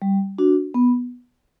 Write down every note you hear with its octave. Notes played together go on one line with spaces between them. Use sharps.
G3
D4 F#4
B3